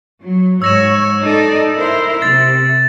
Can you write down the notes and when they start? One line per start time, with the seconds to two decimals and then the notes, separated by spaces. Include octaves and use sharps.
0.22 F#3
0.62 G#2 C#5 E6 A#6 E7
1.21 D#4 A4 D5
1.74 E4 A#4 C5
2.22 C3 A6